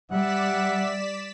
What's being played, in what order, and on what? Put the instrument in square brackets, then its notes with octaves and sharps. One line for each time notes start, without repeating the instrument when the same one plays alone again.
[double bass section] G3 [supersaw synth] D5 B6 E7 [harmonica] E5 F#5